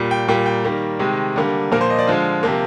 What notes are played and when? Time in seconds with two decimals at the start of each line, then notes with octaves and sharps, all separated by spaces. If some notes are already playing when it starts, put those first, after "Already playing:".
Already playing: A#2 G3 A#3
0.11 G5
0.28 A#2 G3 A#3 G5
0.46 G5
0.65 D#3 G3 A#3
0.99 C3 D#3 G#3
1.36 D3 G3 A#3
1.72 A#2 F3 A#3 A#4
1.81 C5
1.90 D#5
1.99 D5
2.07 D3 F3 G#3 F4
2.43 C3 F3 A#3